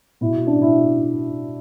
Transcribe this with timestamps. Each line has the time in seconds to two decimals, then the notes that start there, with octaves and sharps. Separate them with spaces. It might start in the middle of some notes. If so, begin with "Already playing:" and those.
0.21 B2 E4
0.47 D4
0.60 B2 E4